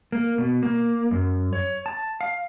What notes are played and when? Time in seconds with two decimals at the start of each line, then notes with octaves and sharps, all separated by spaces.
0.12 A#3
0.38 B2
0.63 A#3
1.11 F#2
1.53 C#5
1.86 A5
2.21 F5